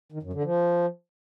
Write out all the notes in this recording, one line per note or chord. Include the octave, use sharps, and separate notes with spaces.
D#3
F#2
D3
F3